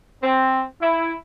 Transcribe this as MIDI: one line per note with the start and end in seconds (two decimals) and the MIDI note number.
0.23 0.63 60
0.81 1.12 64